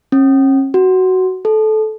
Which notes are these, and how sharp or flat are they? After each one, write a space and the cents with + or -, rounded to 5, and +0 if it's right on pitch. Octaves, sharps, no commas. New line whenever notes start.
C#4 -40
F#4 +10
A4 -20